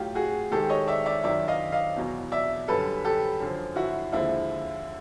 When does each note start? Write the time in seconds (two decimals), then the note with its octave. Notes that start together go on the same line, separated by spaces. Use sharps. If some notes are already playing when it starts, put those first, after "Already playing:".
Already playing: A2 F#3 F4 G4
0.15 F#4 G#4
0.51 G#2 D#3 G#3 G4 A4
0.69 C#5 D#5
0.88 D5 E5
1.06 D5 E5
1.23 F#2 D#3 F#3 D5 E5
1.48 D#5 F5
1.72 D#5 F5
1.96 E2 B2 F#3
2.32 D5 E5
2.68 F#2 D3 G3 A4 B4
3.05 G4 A4
3.40 F#2 D3 F3
3.76 E4 F#4
4.12 D#2 D3 F3 G#3 E4